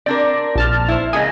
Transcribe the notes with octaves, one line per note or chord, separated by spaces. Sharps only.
C4 D4 A#4 D5
A#1 A5 F6
E4 C5
C#3 G#3 A#3 D#5 G#5